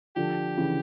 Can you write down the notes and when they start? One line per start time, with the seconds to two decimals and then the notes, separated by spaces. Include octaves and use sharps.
0.16 D3 F3 G4
0.57 C#3 E3